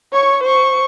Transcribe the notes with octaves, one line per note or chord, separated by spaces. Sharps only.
C#5 C#6
C5 C#6